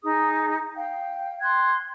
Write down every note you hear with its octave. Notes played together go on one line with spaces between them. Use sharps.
D#4 G#4 D#6
F5 G5
G5 C6 F#6 G#6